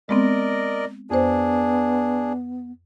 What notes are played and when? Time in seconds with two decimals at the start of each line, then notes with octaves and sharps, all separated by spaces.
0.09 G#3 B3 C4 A#4 D5 D#5
1.10 F2 B3 D4 G#4 C5